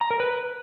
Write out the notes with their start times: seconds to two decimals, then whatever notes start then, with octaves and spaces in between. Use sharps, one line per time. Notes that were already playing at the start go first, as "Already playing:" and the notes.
0.01 A#5
0.10 A#4
0.20 B4